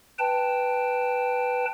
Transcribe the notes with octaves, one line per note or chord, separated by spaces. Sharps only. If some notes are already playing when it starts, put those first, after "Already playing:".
B4 G5 A5